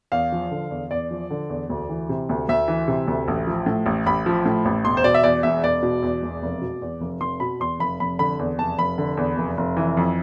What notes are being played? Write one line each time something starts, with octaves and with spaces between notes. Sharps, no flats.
E2 F5
F3
D3
E2
E2 D5
F3
D3
E2
D2
E3
C3
D2
D2 E5
E3
C3
D2
A1
F3
A2
A1
A1 B5
F3
A2
A1
E1 C6
C5
B2 D5
E5
E2 D5
E1 E5
E1 D5
B2
E2
E1
F1
B2
E2
F1
F1 C6
B2 B5
E2 C6
F1 B5
F1 B5
D3 B5
E2
F1 A5
F1 B5
D3
E2
F1
F1
E3
F2